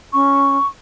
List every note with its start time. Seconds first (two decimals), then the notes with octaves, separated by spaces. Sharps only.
0.12 C#4 C#6